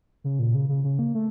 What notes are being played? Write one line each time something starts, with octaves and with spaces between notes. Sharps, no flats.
C#3
A#2
C#3
C#3
C#3
A#3
A3